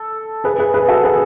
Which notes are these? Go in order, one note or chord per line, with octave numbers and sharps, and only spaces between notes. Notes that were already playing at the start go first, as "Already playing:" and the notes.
Already playing: A4
G#4 B4
G#4 B4
G#4 B4
F#4 A4
G#4 B4